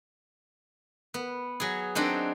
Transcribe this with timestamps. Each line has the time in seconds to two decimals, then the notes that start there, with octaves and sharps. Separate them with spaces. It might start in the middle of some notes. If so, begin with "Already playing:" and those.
1.14 B3
1.60 F#3 G#4
1.95 F#3 C4 D4 D#4